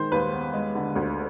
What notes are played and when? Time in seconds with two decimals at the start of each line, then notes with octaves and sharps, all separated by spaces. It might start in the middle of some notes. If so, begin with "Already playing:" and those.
Already playing: D#3 G#3 C5
0.12 D#2 B4
0.33 B3
0.54 G#3
0.75 D3
0.96 D2